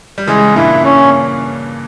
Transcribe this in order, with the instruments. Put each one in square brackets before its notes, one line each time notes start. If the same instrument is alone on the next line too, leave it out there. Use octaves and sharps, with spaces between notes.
[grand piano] G3
[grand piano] C#3 E3 [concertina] G#3
[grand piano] G2 A#2 [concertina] E4
[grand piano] G2 A#2 [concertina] C#4